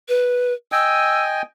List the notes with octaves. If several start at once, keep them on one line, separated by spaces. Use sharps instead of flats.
B4
D#5 G5 G#5 E6